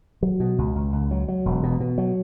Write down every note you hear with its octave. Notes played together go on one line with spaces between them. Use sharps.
F#3
B2
C#2
C#2
C#2
F#3
F#3
E1
B2
B2
F#3